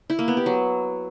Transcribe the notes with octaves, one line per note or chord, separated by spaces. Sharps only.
E4
A#3
B3
G4
F#3